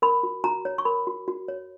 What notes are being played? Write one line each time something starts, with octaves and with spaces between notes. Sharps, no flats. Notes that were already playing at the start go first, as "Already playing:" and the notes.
A#4 B5
F#4
F#4 A#5
C#5
C#6
A#4 B5
F#4
F#4
C#5